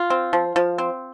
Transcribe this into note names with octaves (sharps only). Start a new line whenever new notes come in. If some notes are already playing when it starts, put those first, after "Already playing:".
Already playing: F4
C4
F3
F3
C4